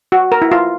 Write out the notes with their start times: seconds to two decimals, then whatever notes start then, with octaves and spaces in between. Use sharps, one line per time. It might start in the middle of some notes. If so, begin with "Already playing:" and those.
0.12 F#4
0.32 A#4
0.42 E4
0.52 F4